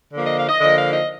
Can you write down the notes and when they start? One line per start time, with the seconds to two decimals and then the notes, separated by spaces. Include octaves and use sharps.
0.13 D3 F3 A#3
0.25 D#5
0.37 F5
0.49 D#5
0.60 D3 F3 A#3 D#5
0.76 F5
0.92 D#5